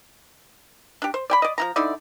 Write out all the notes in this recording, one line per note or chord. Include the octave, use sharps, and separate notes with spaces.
D4 G4
C5
D5 G5 B5
D5 D#5
F3 E4 A#5
D3 D#4 E4 D5